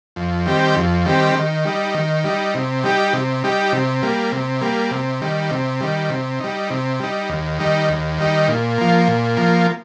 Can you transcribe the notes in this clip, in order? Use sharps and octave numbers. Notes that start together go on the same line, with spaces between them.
F2
D#3 G3 C4 G4
F2
D#3 G3 C4 G4
D#3
G3 D#4
D#3
G3 D#4
C3
G3 D#4 G4
C3
G3 D#4 G4
C3
G3 A#3
C3
G3 A#3
C3
D#3 G3
C3
D#3 G3
C3
G3 D#4
C3
G3 D#4
D#2
D#3 G3 D#4
D#2
D#3 G3 D#4
A#2
F3 A#3
A#2
F3 A#3